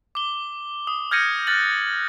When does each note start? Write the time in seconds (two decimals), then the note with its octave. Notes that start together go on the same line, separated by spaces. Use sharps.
0.15 D6 G7
0.87 D#6
1.11 F6 G6 G#6 A#6 C#7 D#7
1.47 F6 F#6 A6 F#7